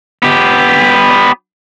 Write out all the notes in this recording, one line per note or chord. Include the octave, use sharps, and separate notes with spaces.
B3 G4